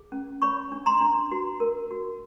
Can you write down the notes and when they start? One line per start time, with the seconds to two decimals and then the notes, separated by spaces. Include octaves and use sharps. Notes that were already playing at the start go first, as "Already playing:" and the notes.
Already playing: G#4
0.12 C#4
0.42 C#5 B5 C#6
0.72 D4
0.86 A#5 C6
1.01 D4
1.32 F#4
1.60 A#4
1.91 F#4